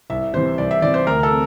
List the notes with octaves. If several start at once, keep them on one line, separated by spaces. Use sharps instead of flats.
C2 E5
C3 E3 C5
C2 D5
E5
C3 E3 D5
C5
D2 A#4
A4
C4